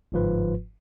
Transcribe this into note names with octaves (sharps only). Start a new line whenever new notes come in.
G1 G#2 F3 F4 B4